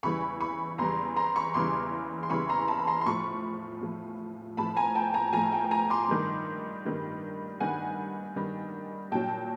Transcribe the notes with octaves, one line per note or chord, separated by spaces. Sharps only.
E2 C#3 E3 G3 B5 C#6
B5 C#6
E2 C#3 E3 G3 A#5 C6
A#5 C6
B5 C#6
E2 C#3 E3 G3 C6 D6
C6
E2 C#3 E3 G3 B5 C#6
A#5 C6
A5 B5
B5
A#5 C6
C6
A2 F3 B5 C#6
A2 F3
A2 F3 A5 B5
G#5 A#5
G5 A5
G#5 A#5
A5
A2 F3 G#5 A#5
G5 A5
G#5 A#5
C6 D6
G2 D#3 G3
G2 D#3 G3
G2 D#3 G3 F#5 G#5
G2 D#3 G3
A#2 F#3 G5 A5